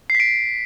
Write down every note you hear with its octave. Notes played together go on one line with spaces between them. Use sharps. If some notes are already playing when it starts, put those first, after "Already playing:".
C7
B6
D7